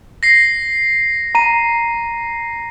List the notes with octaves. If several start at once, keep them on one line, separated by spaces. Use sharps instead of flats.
A#6 C7
A#5 D#7